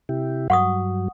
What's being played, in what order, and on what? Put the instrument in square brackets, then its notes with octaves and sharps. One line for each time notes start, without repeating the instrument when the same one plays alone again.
[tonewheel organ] C3 E4 G4
[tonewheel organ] G2 F#3 [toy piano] F#5 C#6 D#6